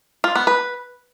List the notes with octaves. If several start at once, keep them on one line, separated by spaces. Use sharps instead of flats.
F4
B3
B4